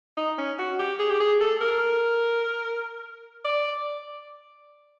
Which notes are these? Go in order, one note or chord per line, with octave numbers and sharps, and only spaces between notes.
D#4
C#4
F#4
G4
G#4
G4
G#4
A4
A#4
D5